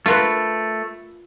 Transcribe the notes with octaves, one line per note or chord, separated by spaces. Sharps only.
A3 F4 A#4 B4